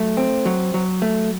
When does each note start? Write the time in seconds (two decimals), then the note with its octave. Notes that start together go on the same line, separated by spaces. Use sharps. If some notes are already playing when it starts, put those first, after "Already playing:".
Already playing: F#3 A3
0.17 C4
0.46 F#3
0.74 F#3
1.02 A3